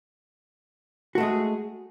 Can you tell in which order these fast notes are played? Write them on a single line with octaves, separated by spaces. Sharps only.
F#4 A3 G#3 G#4